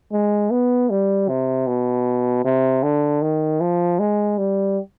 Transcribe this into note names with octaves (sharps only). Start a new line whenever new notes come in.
G#3
B3
G3
C3
B2
C3
D3
D#3
F3
G#3
G3